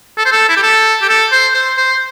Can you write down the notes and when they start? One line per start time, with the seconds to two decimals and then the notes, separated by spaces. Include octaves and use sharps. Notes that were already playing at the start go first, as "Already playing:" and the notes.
0.18 A4
0.25 C5
0.32 A4
0.49 E4
0.57 G4
0.63 A4
1.02 G4
1.09 A4
1.32 C5
1.54 C5
1.78 C5